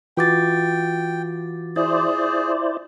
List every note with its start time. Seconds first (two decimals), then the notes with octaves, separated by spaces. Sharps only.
0.17 E3 F4 F#4 G5 D6 A6
1.76 E4 G#4 C5 D5